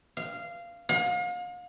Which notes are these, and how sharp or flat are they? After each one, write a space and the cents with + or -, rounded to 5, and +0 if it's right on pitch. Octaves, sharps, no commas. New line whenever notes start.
F5 -15
F5 +40